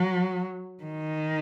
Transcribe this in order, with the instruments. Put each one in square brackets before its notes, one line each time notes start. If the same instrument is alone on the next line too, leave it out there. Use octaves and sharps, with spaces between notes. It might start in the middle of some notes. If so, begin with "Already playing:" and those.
Already playing: [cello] F#3
D#3